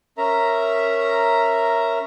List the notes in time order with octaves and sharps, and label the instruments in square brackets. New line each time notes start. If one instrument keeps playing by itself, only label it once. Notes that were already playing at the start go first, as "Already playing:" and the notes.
[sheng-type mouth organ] C#4 A#4 E5 A#5